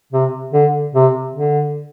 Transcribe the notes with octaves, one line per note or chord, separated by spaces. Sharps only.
C3
D3
C3
D3